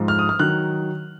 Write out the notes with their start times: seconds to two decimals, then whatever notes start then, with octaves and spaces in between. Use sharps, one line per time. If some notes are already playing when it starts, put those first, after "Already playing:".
Already playing: G#2 F3
0.08 F6
0.19 D#6
0.29 F6
0.39 D#3 F#3 F#6